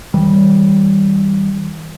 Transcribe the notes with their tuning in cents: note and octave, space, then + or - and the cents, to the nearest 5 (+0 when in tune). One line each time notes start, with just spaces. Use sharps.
E3 -45 G3 +0